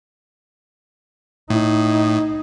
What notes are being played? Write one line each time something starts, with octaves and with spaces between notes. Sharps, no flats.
A2 D#4